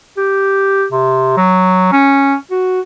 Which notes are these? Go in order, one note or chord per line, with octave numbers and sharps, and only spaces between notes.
G4
C3
F#3
C#4
F#4